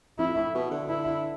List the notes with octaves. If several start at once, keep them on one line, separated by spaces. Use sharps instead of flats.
F2 E4
A2
B2
D3
E4